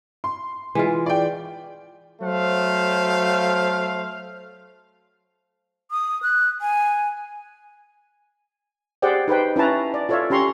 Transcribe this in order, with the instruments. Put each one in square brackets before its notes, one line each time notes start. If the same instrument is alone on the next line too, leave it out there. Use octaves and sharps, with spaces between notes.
[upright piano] C6
[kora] E3 G#3 F4
[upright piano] D5 G5
[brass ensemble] F#3 A3 C5 F5
[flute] D#6
F#6
G#5
[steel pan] G4 G#4 C5 D5 F#5 G5
D#4 B4 C5 G5
C#4 E4 B4 A5 A#5
D5
F4 A4 C#5 D5 E5 F5
C#4 G4 A#5 C6 C#6